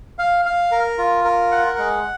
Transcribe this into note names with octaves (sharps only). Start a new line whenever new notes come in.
F5
F5
A#4
F4
A#4
F#5
G#3